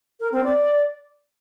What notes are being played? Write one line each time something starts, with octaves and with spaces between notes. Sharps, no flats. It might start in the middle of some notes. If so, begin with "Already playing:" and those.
A#4
C4
D5